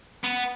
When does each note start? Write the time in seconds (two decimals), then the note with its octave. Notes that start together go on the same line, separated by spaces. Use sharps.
0.24 B3